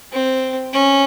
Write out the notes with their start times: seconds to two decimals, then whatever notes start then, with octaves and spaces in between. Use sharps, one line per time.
0.12 C4
0.73 C#4